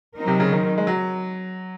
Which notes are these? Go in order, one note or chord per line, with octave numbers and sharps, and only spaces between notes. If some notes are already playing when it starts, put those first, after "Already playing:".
F#3 C4 D#4 A#4
C3
C#3
D#3
G#3
F#3